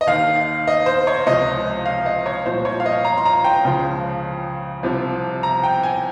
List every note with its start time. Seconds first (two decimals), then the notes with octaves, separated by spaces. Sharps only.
0.01 D#5
0.07 D#2 D#3 F5
0.67 D#5
0.86 C5
1.07 C#5
1.27 C#2 C3 F3 D#5
1.86 F5
2.06 D#5
2.26 C#5
2.46 C2 A#2 F3 C5
2.65 C#5
2.80 F5
2.86 D#5
3.05 A#5
3.17 C6
3.26 A#5
3.44 G5
3.65 C#2 C#3 F3
4.83 C2 C3 F3
5.43 A#5
5.64 G5
5.83 G#5